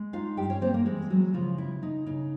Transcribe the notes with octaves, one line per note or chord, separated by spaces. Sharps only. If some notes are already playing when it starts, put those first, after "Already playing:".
Already playing: G#3
D#4 F4 F5
G2 G4 G5
C#4 C#5
A#3 C4 C5
A#3 A#4
E3 G#3 G#4
F#3 G#3 F#4
C#3 F3 F4
B3 E4
C#3 D#4
C#3 D#4